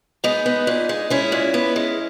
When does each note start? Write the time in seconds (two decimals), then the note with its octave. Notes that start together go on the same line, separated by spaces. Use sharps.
0.24 G#3 B3 D#4
0.46 B3
0.67 A#2
0.89 G#3
1.10 G#3 C#4 E4
1.32 A#2
1.54 B3
1.76 G#3